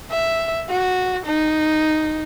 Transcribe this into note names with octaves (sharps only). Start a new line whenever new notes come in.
E5
F#4
D#4